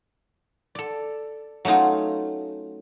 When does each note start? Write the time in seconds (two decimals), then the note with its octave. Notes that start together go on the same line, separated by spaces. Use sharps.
0.75 A4 D5
1.65 F#3 A3 C#4 D#4 F4